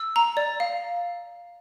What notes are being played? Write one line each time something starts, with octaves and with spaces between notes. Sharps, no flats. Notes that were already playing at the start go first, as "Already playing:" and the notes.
Already playing: E6
A#5
D5
F5